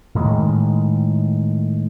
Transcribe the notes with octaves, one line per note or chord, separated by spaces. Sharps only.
A2 D#3 G#3